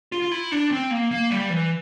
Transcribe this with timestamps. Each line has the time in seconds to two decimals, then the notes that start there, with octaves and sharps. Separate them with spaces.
0.12 F4
0.22 F4
0.31 E4
0.52 D4
0.71 C4
0.91 A#3
1.11 A#3
1.30 G3
1.50 E3